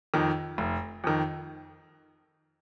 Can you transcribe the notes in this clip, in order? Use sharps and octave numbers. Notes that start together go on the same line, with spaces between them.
F2 D#3
F1
F2 D#3